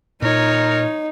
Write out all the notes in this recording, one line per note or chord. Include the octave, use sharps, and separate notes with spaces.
A#2 D#4 A#4 C#5